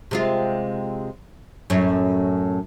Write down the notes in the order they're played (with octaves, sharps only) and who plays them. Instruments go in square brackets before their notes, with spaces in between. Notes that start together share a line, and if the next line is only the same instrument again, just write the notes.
[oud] C3 G#3 F4
F#2 A2 C#4